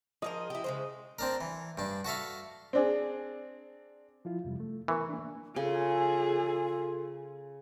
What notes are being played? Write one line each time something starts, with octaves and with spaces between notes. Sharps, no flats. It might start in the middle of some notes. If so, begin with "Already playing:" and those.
F3 G#4 A#4 D#5
E4 G4
C#3 G#3 C5
C4 D4 A#4
E3
G2 D4
F#4 A4 E5 F5
C4 D4 G#4
F3 E4 F4
F2 C3 G3
A3
E3 B3 A#4 C#6
A#3 D4
C#3 F4 G#4 A4